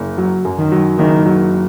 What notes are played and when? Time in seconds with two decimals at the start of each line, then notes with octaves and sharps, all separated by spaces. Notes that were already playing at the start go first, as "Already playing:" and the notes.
Already playing: F#1
0.18 F#3
0.45 F#2
0.58 D#3
0.72 F#3
0.98 F#1 D#3
1.26 F#3